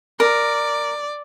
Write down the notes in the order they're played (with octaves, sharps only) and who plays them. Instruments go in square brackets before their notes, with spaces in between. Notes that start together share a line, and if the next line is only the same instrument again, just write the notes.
[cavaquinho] A#4 [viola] D5